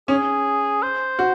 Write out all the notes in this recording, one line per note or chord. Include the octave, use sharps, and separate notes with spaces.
C#4 G#4
C5
F#4